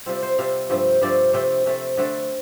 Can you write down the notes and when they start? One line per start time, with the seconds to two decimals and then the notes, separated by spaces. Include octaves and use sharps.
0.06 C3 G3 C4 F4
0.23 C5
0.39 C3 G3 C4 F5
0.70 G2 F3 A3 C4
1.01 G2 F3 A3 C4 D5
1.34 C3 A3 C4 G5
1.66 C3 A3 C4
1.98 D3 A3 C4